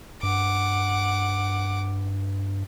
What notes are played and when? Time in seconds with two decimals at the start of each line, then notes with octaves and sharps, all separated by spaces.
0.23 G2 F#5 D6